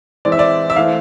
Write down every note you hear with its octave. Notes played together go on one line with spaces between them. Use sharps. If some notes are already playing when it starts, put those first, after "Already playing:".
E3 G#3 C4 D5
E5
D5
E5
E3 A3 C4 F5